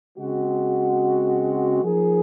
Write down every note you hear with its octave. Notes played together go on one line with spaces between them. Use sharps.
C#3 G#3 C4 F#4
F3 A#3 D#4 G#4